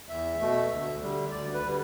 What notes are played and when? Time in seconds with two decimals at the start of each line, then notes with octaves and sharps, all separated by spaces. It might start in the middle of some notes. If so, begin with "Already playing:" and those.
0.09 E2 E5
0.39 B2 A3
0.70 D2
1.01 D3 G3
1.31 D2 D5
1.53 B4
1.63 D3 G3